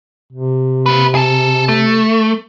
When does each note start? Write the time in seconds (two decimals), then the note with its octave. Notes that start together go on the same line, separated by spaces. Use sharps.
0.33 C3
0.86 A#3 B4
1.15 G#4 A4
1.69 A3